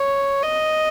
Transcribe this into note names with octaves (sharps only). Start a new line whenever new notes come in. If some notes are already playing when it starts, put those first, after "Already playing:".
Already playing: C#5
D#5